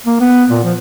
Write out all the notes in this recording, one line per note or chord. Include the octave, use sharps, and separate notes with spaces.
A#3
B3
A#2
F3